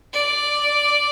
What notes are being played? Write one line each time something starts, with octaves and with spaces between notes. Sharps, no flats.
D5